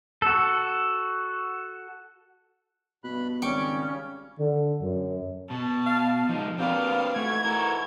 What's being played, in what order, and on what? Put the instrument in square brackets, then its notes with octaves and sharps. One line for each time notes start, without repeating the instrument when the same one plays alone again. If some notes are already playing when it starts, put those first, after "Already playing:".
[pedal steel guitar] F#4 A4
[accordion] G2 B5 F#6 [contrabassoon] B2
[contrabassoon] G#1 [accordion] C#3 G3 [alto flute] C#4 [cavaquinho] G5 C#6 D6
[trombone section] D3
F#2
[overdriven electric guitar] B2 [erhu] A5
[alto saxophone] F5
[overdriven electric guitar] F3 G#3 [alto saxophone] D#4
[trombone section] D2 A#3 D4 [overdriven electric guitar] C4 B4 [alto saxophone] G4 [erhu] F5
[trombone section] G#2 E3 F#4 [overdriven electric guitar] A3 [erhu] G#6
[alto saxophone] E4 [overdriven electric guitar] A4 A#4